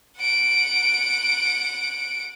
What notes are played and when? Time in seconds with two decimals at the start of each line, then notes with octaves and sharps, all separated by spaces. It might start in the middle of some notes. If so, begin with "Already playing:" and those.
0.18 F#5 D7